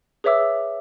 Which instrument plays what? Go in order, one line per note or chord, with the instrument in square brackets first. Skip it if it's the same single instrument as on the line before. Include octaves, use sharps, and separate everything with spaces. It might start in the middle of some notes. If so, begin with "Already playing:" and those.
[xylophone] G#4 B4 C#5 E5 D6 E6